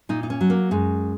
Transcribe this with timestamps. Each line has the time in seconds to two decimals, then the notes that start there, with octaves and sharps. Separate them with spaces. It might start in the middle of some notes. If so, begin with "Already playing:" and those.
0.09 A#2 D#4
0.23 D#4
0.30 C#4
0.41 F#3
0.50 A#3
0.71 F#2 G#3